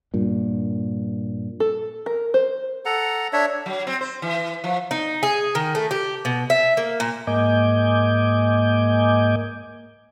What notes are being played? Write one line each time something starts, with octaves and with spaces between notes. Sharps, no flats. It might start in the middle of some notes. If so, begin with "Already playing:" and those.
G2 A#2
A4
A#4
C5
A4 F#5 A#5
D4 C#5 E5
F#3
C4
C5
E3
F3
D#4
G#4
D#3
A3
G4
B2
E5
A#3
A#2
G#2 A#3 D#5 G#5 D6 G6